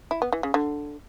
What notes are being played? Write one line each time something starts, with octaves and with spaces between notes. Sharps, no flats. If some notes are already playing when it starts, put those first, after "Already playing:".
E4
B3
E3
C#3
D3